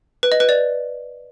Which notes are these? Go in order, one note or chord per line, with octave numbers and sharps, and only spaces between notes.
B4
D#5
B4
D5